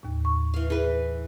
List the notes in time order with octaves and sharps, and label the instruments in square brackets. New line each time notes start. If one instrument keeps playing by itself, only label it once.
[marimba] D#2 A2
C#6
[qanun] E3 F5
[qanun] E3 B4 [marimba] G#4